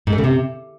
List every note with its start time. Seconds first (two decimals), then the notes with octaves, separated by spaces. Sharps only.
0.07 G#2
0.13 A3
0.18 C#3
0.24 C3